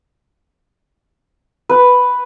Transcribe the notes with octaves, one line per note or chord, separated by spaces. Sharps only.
B4